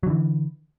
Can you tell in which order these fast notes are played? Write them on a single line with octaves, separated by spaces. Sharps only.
F#3 D3 E3